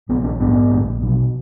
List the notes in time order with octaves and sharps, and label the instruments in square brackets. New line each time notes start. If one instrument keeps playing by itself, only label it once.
[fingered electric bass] A#1 B3
C#4
G#2 B3
A#1
B2